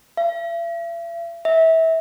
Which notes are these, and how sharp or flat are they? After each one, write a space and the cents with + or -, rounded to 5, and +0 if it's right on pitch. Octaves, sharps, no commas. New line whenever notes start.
E5 +45
E5 -25